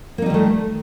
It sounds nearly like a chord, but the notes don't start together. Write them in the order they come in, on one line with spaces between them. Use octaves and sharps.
A#3 D#4 G3 D#3 A3